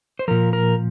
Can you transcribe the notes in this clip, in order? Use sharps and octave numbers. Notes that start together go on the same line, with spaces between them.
C5
A#2 F3 A#4
A#4